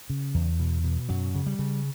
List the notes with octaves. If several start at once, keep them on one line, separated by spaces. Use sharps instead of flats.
C#3
E2
B2
B2
F#2 F#3
C#3
G3
C#3